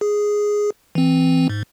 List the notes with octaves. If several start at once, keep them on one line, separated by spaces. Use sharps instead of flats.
G#4
E3 C4
G#2